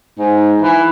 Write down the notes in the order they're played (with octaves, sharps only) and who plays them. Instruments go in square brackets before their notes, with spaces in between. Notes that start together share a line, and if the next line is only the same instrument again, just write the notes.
[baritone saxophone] G#2
E3